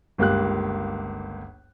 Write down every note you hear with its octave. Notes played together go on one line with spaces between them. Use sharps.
G1 C#2 A#3 G4 F5 F#6